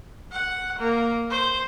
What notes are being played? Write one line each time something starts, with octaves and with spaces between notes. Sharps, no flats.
F#5
A#3
C5